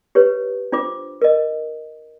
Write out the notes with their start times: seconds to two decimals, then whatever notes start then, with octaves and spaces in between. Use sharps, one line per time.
0.15 G4 B4 C#5
0.72 D4 F4 C5 D6
1.22 A#4 D#5